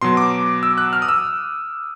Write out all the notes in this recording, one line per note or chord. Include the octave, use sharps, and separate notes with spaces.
B2 F#3 C6
D6
E6
F#6
F6
D#6
E6